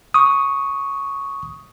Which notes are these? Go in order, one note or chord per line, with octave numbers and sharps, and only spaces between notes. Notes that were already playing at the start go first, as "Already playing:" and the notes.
C#6 D#6